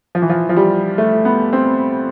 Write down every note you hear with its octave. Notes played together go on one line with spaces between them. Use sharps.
F3
E3
F3
F3
G3
A3
B3
C4